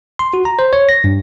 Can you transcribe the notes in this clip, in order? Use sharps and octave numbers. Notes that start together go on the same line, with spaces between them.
C6
F#4
A#5
C5
C#5
A#6
G2